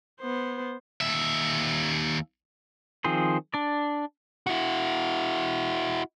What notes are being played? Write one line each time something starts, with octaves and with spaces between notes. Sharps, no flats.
B3 C5
D#2 E5
D#3 F3 C4 G#4 C5
D4 D5
E4 F#4